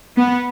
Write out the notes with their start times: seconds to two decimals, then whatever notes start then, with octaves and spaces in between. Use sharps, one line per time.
0.17 B3